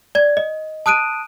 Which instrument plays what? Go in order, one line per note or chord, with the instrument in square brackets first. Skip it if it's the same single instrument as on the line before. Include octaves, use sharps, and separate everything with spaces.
[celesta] D5 G#6
D#5
A5 D#6 F#6 D7 D#7